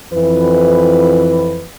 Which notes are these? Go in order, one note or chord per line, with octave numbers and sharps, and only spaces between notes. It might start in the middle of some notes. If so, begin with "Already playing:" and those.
F2 E3 B4